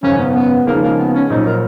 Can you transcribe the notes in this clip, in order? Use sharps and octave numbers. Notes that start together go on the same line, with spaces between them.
G#1 F#2 C#3 G#3 C#4
B3
B3
D#2 C#3 F3 G#3 A#3 D#4
A#3
B3
C#4
A#1 A#2 F#3 D#4
A#4